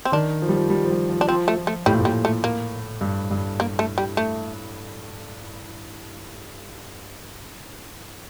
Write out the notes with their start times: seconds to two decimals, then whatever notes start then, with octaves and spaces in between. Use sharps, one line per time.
0.05 C4
0.12 D#3 D4
0.42 F3
0.49 G3
0.56 F3
0.70 G3
0.85 F3
0.90 G3
1.10 F3
1.21 D4
1.28 F3 C4
1.48 A3
1.58 F3
1.67 A3
1.86 A2 G3
1.93 A#2
2.01 A2 G3
2.25 A3
2.44 A#3
3.01 G2
3.31 G2
3.60 A#3
3.79 A3
3.98 G3
4.17 A3